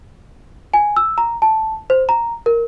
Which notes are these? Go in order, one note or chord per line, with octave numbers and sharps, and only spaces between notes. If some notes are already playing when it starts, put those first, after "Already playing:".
G#5
E6
A#5
A5
C5
A#5
A#4